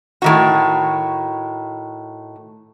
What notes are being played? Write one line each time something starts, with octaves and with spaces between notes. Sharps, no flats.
A2 D#3 F#4